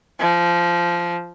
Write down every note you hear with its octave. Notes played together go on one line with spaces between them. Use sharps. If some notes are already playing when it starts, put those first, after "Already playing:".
F3